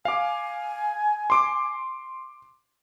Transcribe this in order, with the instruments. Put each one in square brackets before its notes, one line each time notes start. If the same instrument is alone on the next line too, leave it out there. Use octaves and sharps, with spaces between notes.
[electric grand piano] F5 D6 [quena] G#5
[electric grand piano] C6 D6